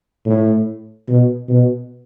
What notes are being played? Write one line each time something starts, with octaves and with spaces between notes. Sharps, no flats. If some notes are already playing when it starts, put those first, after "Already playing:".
A2
B2
B2